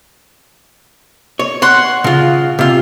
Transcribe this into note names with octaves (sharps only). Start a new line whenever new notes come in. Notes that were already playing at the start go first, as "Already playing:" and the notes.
C#5
C#5 F#5 C6
C#3 F4
C3 F4